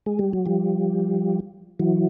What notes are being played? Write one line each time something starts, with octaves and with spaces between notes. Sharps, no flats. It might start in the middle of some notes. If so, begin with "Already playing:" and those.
G#3
G3
F#3
F3 G3
E3 F#3